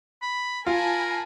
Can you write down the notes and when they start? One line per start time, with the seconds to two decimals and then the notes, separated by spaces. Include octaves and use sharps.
0.22 B5
0.67 F4 A#4 G#5 A5 B5